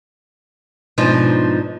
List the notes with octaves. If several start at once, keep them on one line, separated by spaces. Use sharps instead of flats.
G#2 B2 F3 D4 D#4 C5